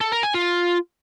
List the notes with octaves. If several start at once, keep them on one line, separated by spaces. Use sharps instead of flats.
A4
A#4
G#5
F4